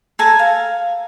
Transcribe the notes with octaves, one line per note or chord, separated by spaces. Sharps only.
A4 G#5 A#5
F5